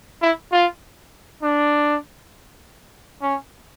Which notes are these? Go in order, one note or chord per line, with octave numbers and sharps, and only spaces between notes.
E4
F4
D4
C#4